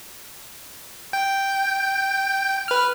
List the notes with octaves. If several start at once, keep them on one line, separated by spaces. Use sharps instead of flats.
G5
B4 F6